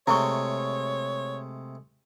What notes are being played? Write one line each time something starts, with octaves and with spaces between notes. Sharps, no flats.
C3 G#3 A3 E4 C#5 C#6